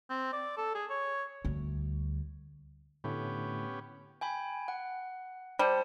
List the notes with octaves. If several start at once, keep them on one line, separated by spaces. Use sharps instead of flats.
C4
D5
A4
G#4
C#5
D2 G3
A2 D3 A3 B3 C#4 G4
G5 G#5 B5
F#5
G3 C5 A5